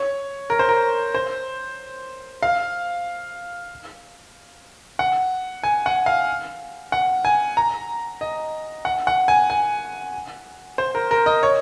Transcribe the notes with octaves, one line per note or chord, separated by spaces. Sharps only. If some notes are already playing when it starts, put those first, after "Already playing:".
Already playing: C#5
A#4
C5
A#4
C5
F5
F#5
G#5
F#5
F5
F#5
G#5
A#5
D#5
F#5
F#5
G#5
G#5
C5
A#4
A#4
D#5
C#5